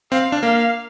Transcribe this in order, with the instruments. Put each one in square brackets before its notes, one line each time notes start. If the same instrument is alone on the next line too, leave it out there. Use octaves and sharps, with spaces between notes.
[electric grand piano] C4 [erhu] F5
[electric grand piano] D4
[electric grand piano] A#3 [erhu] F5